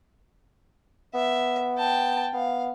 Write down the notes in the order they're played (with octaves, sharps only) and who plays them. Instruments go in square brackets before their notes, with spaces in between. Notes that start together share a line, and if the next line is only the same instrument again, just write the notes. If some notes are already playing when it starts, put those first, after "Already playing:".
[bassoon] B3 [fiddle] E5
[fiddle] G5 A5
[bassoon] B3 [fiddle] F5